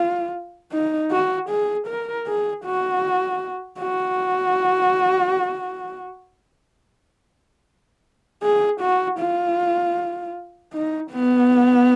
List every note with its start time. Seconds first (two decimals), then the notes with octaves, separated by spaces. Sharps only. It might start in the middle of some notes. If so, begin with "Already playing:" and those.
Already playing: F4
0.72 D#4
1.12 F#4
1.50 G#4
1.88 A#4
2.27 G#4
2.65 F#4
3.80 F#4
8.43 G#4
8.81 F#4
9.19 F4
10.73 D#4
11.11 B3